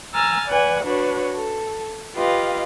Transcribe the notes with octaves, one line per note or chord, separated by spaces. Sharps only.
G#5 A#5 E6 F6 A6
B4 D5 F#5 G#5
D4 F#4 B4 C#5
A4
F4 G4 B4 D#5 F5